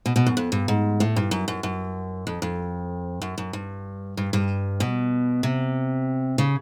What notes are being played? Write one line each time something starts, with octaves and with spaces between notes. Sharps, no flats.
B2
B2
F#2
F2
G2
G#2
A2
G2
F#2
F#2
F#2
F2
F2
F#2
F#2
G2
G2
G2
B2
C3
C#3